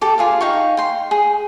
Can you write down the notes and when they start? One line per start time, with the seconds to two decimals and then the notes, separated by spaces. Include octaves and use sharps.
0.01 G4 A4 D6
0.18 F4 G#4 F5
0.41 D#4 F5 G5 C#6
0.77 G5 C6
1.11 G#4